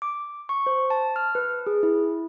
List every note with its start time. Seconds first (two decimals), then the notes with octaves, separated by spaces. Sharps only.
0.02 D6
0.49 C#6
0.66 C5
0.90 A5
1.16 F6
1.35 B4
1.67 G#4
1.83 E4